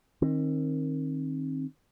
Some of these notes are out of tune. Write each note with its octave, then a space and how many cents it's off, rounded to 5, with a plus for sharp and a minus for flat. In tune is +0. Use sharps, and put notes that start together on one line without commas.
D#3 +0 C4 +35